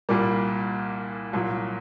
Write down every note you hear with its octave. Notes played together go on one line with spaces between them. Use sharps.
C2 A#2 G3 A#3
C2 A#2 F#3